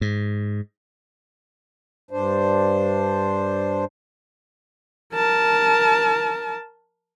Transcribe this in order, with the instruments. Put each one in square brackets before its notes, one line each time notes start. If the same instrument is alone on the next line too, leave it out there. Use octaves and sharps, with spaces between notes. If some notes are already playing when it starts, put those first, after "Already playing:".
[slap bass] G#2
[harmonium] G2 D4 C5
[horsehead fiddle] A#4 A5